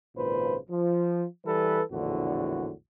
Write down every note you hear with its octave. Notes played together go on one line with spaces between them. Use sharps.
G#1 A#2 C#3 B4 C5
F3
E3 G3 A4 B4
A#1 E2 A2 D3 F#4